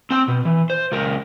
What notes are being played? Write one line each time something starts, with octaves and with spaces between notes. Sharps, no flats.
C4 G5
B2
E3
C5
C#2 A#4